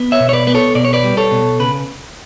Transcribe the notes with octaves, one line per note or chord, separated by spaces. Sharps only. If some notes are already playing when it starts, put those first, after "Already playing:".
Already playing: B3
C#5 E5
B2
C#5
B4 D5
B3 B4
A4 C#5
B2 D5
C#5
B4 D5
G3
A4 C#5
B2
C#3 B4